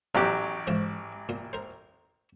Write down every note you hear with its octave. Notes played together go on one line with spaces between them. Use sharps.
A1 F3 F#3 D#4 G4
G#2 E3 F3
A#2
A#4 C5